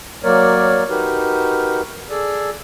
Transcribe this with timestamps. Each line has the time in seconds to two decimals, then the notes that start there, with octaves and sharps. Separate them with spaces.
0.24 F#3 A#3 A#4 C#5 D5
0.89 D#4 F#4 G4 A#4 B4
2.10 G#4 A4 D5